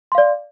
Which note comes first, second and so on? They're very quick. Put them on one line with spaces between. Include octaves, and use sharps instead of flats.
C6 F5 D5